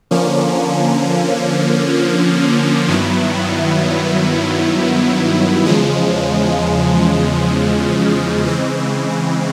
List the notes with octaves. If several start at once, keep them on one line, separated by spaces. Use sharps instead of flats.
D3 F3 A#3 C#4
G2 D#3 F#3 B3 E4
E2 C#3 F3 G#3
C#3 E3 G#3 C4